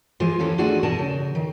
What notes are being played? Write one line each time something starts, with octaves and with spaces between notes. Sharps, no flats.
E3 G#3 F4 G#4 C5
D#2 E3 C#4 A4 F5
A3 D4 F4 F#4 G#4 D5
E2 B2 G#4 A#4 A5
C#3
D#3